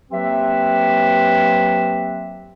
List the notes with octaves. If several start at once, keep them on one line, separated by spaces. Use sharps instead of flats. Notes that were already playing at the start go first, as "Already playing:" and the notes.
F#3 A#3 C4 G4 B4 E5